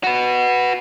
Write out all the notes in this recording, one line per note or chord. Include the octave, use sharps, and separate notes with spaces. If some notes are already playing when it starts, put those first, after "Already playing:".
F#4 B4